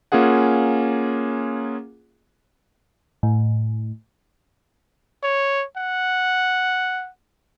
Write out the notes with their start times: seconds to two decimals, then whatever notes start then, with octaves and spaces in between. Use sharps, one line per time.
0.12 A#3 C#4 F4 G#4 F#5
3.23 A2
5.23 C#5
5.77 F#5